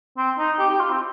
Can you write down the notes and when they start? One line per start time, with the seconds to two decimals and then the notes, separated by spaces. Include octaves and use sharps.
0.17 C4
0.39 D#4
0.59 G4
0.70 G4
0.79 F4
0.90 C4